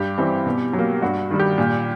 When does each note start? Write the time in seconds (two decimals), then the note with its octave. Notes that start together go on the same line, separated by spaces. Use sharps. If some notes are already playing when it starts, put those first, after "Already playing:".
Already playing: G2 G4
0.18 E3 G3 C4
0.46 B2
0.73 F#3
0.79 A#3
1.02 G2 F#4
1.31 D#3 G3
1.39 G4
1.58 A#2